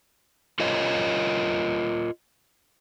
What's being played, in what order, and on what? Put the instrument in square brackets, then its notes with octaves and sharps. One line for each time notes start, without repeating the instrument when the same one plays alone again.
[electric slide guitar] F4 A#4 C#5 D#5